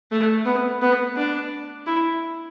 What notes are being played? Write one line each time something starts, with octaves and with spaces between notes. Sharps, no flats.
A3
B3
B3
D4
E4